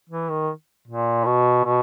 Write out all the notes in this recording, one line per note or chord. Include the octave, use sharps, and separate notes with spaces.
E3
D#3
A#2
B2
B2